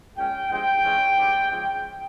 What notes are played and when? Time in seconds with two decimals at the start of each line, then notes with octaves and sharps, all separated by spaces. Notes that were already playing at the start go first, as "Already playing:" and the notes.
0.16 A#2 G#3 C#4 G5
0.50 G2 F3 G#3 C4 G5
0.83 E3 G#3 C#4
1.17 G#2 G3 C4
1.50 C#3 F3 G#3 C#4 G5